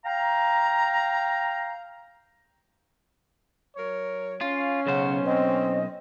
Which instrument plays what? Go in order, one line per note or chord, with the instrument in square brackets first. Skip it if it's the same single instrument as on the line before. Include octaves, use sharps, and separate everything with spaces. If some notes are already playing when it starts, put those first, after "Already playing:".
[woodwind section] F5 G5 A#5
[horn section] F#3 A#4 C#5
[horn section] C#4 [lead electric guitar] F4 [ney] F5
[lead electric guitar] B1 C5 [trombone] C#3 [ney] F#5
[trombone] C4 [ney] D#5